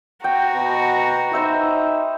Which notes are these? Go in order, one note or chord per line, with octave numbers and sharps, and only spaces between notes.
F#4 G5 A#5
B2
D#4 C5 E5 B5